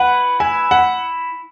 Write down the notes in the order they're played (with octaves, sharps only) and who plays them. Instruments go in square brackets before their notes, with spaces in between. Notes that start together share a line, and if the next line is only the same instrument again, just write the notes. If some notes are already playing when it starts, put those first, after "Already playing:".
Already playing: [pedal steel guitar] E4 B4 [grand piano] F#5
[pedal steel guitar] E4 [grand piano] G#5
[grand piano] F#5